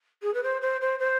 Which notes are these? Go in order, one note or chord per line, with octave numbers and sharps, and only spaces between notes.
G#4
B4
C5
C5
C5
C5